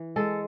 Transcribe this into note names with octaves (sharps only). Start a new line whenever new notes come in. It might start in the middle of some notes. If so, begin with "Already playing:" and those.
Already playing: E3
G#3 A4